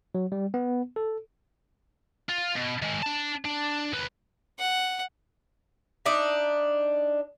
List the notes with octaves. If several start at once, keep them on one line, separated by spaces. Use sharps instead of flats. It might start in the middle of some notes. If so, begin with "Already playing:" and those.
F#3
G3
B3
A4
F4
B2
D#3 G#3
D4 A5
D4
D#2 B4
F#5
D4 D#4 E5